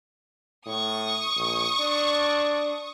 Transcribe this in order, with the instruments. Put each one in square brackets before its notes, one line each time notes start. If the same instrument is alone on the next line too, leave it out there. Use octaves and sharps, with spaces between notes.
[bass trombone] A2 [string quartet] C#6 D#6
[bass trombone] A#1
D4